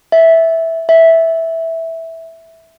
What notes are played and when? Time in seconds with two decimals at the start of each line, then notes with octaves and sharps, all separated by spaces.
0.12 E5
0.89 E5